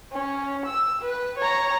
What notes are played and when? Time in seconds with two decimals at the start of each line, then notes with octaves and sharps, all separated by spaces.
0.13 C#4
0.66 E6
1.02 B4
1.39 C#5 A#5